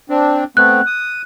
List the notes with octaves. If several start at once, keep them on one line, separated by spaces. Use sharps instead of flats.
C4 D4
A3 B3 C4 F#6
D#6